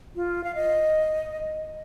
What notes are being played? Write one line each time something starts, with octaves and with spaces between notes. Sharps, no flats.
F4
F5
D#5